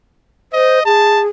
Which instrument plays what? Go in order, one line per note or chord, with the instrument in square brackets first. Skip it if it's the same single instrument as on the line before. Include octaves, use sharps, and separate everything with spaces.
[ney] C5 [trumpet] D#5
[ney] G#4 [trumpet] A5